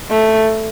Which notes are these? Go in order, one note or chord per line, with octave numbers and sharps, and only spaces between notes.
A3